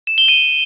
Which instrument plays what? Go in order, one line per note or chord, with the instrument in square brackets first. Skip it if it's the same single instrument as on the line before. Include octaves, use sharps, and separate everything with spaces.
[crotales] E7
G7
D#7